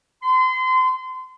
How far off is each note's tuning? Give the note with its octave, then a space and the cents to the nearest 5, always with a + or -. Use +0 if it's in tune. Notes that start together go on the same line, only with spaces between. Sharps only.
C6 -30